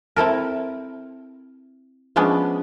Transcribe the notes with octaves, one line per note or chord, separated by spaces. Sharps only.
C4 E4 A4 A#4
F3 G#3 B3 C#4 D4